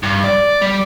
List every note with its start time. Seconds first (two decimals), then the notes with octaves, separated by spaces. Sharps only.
0.03 G2
0.24 D5
0.62 G3